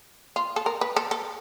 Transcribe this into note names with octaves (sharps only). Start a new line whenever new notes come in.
F4
A4
A#4
B4
A4
A4